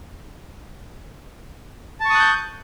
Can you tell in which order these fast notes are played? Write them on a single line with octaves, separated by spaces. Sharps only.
A5 C#6 D#6 F#6 G6